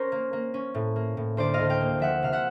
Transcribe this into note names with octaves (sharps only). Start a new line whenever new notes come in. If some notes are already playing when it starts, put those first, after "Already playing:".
Already playing: C#4 A#4 C5
A#3
A#3
C#4
A2
A#3
A2
D2 C5 D5
D#5 F5
D2
F5 G5
A#3
F3 E5 F#5
C3 F5
E5 F#5